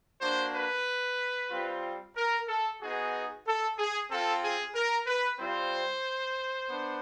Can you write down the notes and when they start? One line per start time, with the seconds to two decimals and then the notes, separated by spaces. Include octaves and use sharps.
0.21 A#3 D4 F#4 C5
0.54 B4
1.51 G3 C4 F4
2.15 A#4
2.47 A4
2.80 B3 D#4 F#4 G#4
3.45 A4
3.77 G#4
4.10 C4 F4 A4
4.41 G#4
4.74 A#4
5.07 B4
5.38 G3 C4 F4 C5
6.68 B3 D4